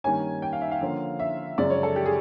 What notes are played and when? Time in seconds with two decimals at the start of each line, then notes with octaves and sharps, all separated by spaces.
0.04 G2 D#3 G3 A#3 C#4 G#5
0.42 G5
0.53 F5
0.61 E5
0.71 F5
0.81 D3 F3 A#3 C#4 F4
1.19 E5
1.57 F#2 C#3 F3 G#3 D5
1.70 C#5
1.83 A4
1.96 G4
2.06 G#4